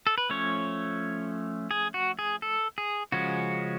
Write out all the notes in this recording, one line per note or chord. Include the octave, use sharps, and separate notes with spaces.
A4
B4
F3 A3 C#4 C#5
G#4
F#4
G#4
A4
G#4
C#3 F3 G#3 C#4 F#4